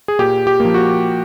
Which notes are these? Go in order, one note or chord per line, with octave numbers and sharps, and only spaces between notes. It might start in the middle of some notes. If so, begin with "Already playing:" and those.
G#4
A#2 G4
G4
F3 A#3
F#4